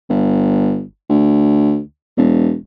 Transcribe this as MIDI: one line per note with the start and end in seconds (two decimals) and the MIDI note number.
0.10 0.83 31
1.10 1.79 38
2.17 2.55 28